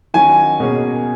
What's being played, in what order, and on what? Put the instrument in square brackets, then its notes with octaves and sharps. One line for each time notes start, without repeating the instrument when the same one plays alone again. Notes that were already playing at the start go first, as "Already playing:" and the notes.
[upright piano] D#3 F#3 C#4 [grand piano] G#5
[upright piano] B2 A#3 C#4 G#4